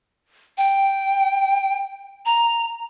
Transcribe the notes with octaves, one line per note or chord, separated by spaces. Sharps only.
G5
A#5